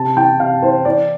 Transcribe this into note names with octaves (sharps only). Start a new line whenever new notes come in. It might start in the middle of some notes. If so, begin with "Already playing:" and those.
Already playing: C3 A5
E3 G5
C3 F5
E3 C5
E3 D5